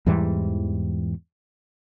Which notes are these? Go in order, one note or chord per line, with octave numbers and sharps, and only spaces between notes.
E2 G#2 E3 G3